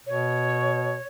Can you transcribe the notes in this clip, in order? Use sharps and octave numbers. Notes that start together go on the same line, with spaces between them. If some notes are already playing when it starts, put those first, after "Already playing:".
B2 C#5